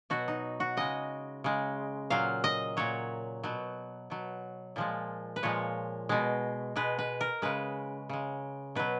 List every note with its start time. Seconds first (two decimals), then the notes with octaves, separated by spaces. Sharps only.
0.10 B2 F#3 F#4
0.28 D#4
0.60 F#4
0.77 C#3 G#3 D#5
1.44 C#3 G#3
2.10 A#2 F#3 F5
2.44 D#5
2.77 A#2 F#3 C#5
3.43 B2 F#3
4.10 B2 F#3
4.76 A#2 F3 G#3
5.36 B4
5.43 A#2 F3 G#3 C#5
6.09 B2 G#3
6.76 B2 G#3 B4
6.99 B4
7.21 A#4
7.42 C#3 G#3 B4
8.09 C#3 G#3
8.75 B2 F#3 B4